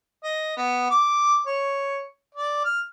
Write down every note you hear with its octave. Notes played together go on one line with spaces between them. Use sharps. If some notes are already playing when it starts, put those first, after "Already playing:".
D#5
B3
D6
C#5
D5
F6